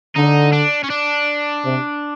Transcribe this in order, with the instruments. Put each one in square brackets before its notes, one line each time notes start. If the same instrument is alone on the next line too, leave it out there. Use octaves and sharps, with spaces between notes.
[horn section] D3 [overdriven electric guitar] D#4
[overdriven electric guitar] D4
C#4
D4
[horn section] C3